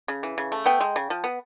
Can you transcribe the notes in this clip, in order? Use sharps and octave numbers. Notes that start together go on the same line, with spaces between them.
C#3
E3
C#3
A3
B3 G5
G#3
C#3
F3
B3